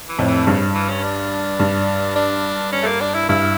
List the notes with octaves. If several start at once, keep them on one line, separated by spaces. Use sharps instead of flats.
E3
F2 A2
E3
G2 C#3
E3
C#4
D4
G2
D4
C#4
A3
A#3
D4
E4
G2 E4